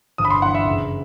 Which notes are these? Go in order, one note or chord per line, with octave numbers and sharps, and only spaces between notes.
G1 D#6
B5
C6
G2 E3 F#5
E5
F#1